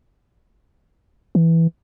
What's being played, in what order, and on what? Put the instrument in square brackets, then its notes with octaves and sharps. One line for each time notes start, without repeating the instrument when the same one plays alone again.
[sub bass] E3